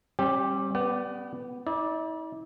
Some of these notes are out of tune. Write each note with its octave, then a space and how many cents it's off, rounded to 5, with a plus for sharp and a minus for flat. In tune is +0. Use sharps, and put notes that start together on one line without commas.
G3 +0 C#4 -45 G4 +0
B3 +0 D5 +0 G5 -40
E4 -45 D5 +0